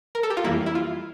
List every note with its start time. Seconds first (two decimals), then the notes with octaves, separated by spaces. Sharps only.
0.15 A#4
0.23 A4
0.30 G4
0.37 F4
0.44 F2 E3 G3 A#3 E4
0.66 E4
0.75 F4